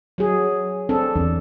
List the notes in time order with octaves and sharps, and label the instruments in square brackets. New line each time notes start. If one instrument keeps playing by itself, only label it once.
[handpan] F#3 G#4
C4 D4 A4
[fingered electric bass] E2 [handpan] D4